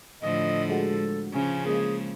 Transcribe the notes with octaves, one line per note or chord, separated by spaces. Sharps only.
A2 D3 F3 D#5
G#3 F#4 A4
C#3 F3 C#4
G#3 A#3 G#4